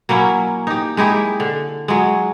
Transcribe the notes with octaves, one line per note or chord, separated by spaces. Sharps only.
F#3 A#3 C#4 E4
D#4 G4
G#3 D#4 E4 G4
D3
F#3 G#3